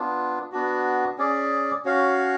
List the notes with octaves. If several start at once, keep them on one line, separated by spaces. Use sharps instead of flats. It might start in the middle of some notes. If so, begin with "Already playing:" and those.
Already playing: B3 D4 F4
B3 D4 F#4
C#4 G#4 D5
C#4 F#4 C#5 F5